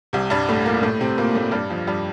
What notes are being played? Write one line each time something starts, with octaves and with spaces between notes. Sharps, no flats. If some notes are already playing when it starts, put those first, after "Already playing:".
C2 C3
G2 G3
A2 A3
A#2 A#3
A2 A3
C3 C4
A#2 A#3
A2 A3
G2 G3
F2 F3
G2 G3